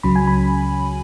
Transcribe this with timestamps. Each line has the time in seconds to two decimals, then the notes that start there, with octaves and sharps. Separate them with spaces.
0.03 C#2 C#3 F#3 C#4 B5
0.16 G#5
0.27 B5